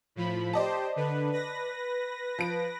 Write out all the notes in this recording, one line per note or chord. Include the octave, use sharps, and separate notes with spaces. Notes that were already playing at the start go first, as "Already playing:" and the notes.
A2 F3 B5
G4 C5 D5 D#5 A5
D3 B4
B4 A#6
F3 D7